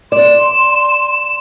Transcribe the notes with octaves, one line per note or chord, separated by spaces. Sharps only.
D5 C6 E7